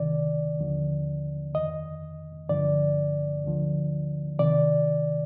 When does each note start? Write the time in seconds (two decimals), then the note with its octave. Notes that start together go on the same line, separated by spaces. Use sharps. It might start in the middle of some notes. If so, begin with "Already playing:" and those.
Already playing: C2 C3 D#3 D5
0.59 D#2 D3 F3
1.54 F2 D#3 D#5
2.49 G2 D3 F3 D5
3.44 D2 D3 F3
4.39 C3 D#3 D5